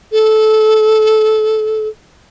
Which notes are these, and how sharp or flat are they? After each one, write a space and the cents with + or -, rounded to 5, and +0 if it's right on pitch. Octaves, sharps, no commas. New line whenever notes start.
A4 -20